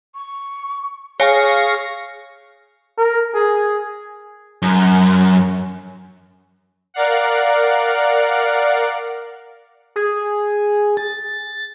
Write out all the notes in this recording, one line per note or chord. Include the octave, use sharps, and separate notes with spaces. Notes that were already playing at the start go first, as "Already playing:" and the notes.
C#6
G#4 C#5 F5 G#5 C#6 A#6
A#4
G#4
F#2
A#4 D5 F5 F#5
G#4
A6